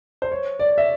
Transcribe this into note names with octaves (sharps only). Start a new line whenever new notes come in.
C5
C#5
D5
E5